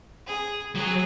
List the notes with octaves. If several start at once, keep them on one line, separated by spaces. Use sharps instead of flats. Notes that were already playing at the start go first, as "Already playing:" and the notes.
G#4
F#3 G#4